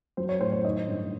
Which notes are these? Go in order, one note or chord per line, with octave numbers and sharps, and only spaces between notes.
F#3 C5
C#5
A2 C5
C#5
D#3 D#5
G2